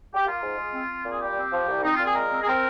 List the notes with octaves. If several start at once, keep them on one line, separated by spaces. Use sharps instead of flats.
G4
A#3 F4
G#2
G#3
C4
C4
A#2
G#4
G3 G4
C4
F3
C2
C4 D#4
A#2 F4
G#4
G#3 A#4
C4
G#4
C4 A#4